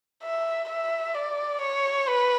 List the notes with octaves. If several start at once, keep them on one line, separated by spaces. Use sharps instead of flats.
E5
E5
D5
C#5
B4